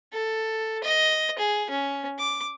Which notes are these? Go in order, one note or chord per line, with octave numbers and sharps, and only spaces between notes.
A4
D#5
G#4
C#4
D6